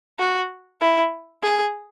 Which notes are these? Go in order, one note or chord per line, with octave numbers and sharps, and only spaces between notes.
F#4
E4
G#4